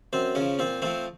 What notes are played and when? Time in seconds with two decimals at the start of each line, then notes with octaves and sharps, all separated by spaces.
0.13 F#2 C4 C5
0.35 C#3 F3 C#4 C#5
0.59 A#2 C4 C5
0.82 F3 A3 C4 C5